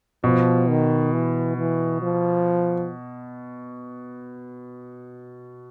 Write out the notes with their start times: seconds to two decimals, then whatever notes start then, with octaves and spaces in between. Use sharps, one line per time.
0.24 B2 F3
0.69 D#3
1.13 E3
1.57 E3
2.02 F3